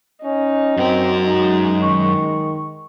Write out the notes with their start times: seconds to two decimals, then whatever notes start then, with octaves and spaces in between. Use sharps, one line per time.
0.24 C#4 D#4
0.77 F#2 C4 F#4 A#4
1.25 G#3 D#4
1.83 D#3 C#6